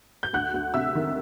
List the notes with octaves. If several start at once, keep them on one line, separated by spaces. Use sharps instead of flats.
G6
D2 F#5 F#6
D2
C3 E5 E6
D#3